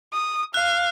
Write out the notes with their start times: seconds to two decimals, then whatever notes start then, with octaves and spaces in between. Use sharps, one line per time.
0.13 D#6
0.54 F5 F#6